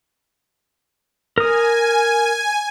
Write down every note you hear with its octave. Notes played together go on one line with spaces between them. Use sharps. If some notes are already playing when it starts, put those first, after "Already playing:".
A#4 G#5 D#6